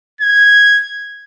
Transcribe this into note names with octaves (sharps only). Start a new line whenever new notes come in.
G#6